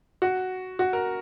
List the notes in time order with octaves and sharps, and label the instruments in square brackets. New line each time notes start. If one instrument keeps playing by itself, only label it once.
[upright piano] F#4
F#4
A#4